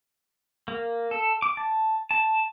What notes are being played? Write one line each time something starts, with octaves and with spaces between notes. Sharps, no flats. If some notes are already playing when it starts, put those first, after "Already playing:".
A#3
A4
D6
A5
A5